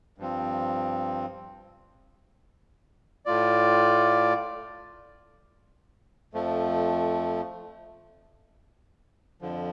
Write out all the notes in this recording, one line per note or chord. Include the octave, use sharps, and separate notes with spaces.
G2 F3 C4
A2 A3 F4 D5
F2 F3 A3
F2 D3 F3